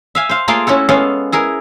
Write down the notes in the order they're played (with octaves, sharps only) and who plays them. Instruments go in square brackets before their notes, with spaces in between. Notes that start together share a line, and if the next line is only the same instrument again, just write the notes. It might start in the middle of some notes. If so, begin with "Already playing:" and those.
[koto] E5 F5 G#5
C5 F5
A3 A#3 F4 G#4 A#4 F5
C#4 E4 F#4 A4
G#3 B3 C#4 A4 F5
E4 G#4 A#4